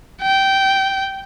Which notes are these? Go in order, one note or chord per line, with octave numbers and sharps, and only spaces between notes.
G5